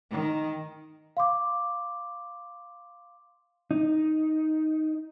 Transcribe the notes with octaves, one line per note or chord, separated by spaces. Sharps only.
D#3
F5 C6 D6
D#4